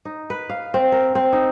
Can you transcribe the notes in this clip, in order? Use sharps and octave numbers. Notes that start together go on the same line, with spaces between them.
D#4
B4
F5
C4
A#4
C4
D#4